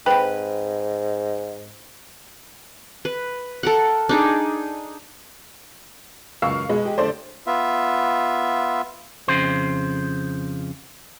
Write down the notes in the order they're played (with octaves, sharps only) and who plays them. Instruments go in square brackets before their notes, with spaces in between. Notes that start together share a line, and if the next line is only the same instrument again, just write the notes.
[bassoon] G#2 [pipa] C4 B4 [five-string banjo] G4
[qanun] B4
A4 A#4 F#5
D4 D#4 G#4
[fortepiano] C#2 F#2 E6 [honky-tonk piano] F5 C#6
[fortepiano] B2 [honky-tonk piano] G#3
[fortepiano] G4
[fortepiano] D3 A3 [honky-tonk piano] C5 D5
[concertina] B3 F4 E5
[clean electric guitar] F2 C#3 C5